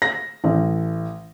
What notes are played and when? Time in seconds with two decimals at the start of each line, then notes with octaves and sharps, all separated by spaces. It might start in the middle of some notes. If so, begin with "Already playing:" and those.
0.02 A#6
0.44 A1